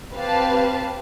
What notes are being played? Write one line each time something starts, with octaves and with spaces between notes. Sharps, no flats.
C4 G4 B4 F5 A5